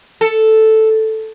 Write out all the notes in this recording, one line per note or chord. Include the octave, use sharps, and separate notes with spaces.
A4